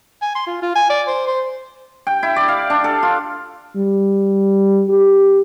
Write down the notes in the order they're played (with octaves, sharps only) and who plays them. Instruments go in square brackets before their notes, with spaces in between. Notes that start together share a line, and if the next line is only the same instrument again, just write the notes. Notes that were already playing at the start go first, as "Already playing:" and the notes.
[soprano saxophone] G#5
C6
F4
F4
G#5
D5
C5
C5
[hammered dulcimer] G5
E4
D5
F5
D4
A4
F4
[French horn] G3
G4